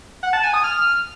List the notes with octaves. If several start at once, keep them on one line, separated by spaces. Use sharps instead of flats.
F#5
A5
G#5
D#6
F6